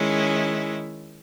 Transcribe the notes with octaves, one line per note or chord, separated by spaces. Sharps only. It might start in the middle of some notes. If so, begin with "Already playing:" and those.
Already playing: D#3 G#3 C#4 E4